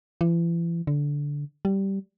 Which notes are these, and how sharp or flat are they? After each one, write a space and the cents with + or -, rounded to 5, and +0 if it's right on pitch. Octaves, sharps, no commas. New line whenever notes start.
E3 +40
D3 -15
G3 -10